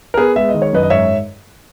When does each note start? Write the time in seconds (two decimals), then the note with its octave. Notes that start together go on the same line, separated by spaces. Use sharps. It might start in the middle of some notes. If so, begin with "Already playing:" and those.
0.14 A#4
0.17 B3 G#4 B4
0.36 G#3 E5
0.49 D#5
0.54 D#3
0.62 C#5
0.73 F#2 B4 D#5
0.83 D#5
0.90 G#2 C#5 E5